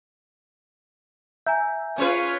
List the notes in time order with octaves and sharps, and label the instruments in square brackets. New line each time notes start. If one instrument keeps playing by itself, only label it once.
[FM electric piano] E5 [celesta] G#5 A#5 G6
[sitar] C#4 G#4 B4 [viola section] F4 C#5